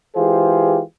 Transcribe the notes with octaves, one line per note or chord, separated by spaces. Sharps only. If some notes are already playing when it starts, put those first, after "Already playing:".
E3 G#3 F4 G4 G#4 C5